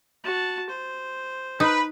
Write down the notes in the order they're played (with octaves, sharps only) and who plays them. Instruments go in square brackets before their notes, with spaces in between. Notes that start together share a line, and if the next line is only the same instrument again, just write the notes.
[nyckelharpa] F#4 A5
C5
[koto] D#4 [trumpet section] B4